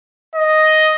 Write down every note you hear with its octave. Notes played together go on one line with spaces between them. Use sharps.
D#5